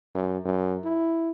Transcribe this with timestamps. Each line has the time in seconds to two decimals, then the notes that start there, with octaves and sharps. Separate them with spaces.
0.15 F#2
0.45 F#2
0.84 E4